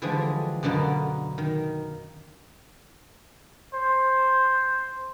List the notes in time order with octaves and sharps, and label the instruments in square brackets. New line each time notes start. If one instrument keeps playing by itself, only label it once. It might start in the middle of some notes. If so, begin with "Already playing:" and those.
[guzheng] D3 E3 F3 G3 G#3 G#4
F#2 B2 D3 A#3 B3
D#3
[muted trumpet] C5